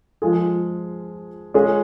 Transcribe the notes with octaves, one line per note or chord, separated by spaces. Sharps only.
F3 G#3 F4 G#4
G#3 C#4 F4 G#4